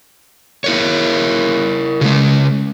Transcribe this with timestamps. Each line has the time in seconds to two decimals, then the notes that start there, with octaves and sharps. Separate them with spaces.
0.64 E4 A#4 C#5
2.01 C#3 G#3